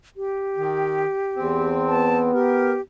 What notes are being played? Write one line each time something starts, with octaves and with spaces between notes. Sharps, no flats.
G4
D#3
E2 C4
B3 A5
G4 A#4